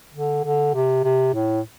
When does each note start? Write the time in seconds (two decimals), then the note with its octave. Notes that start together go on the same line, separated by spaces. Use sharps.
0.14 D3
0.44 D3
0.74 C3
1.04 C3
1.34 A2